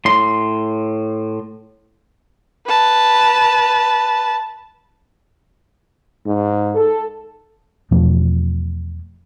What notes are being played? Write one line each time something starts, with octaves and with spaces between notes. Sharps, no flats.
A2 C6
B4 A5
G#2
A4
E2 B2 F3 A3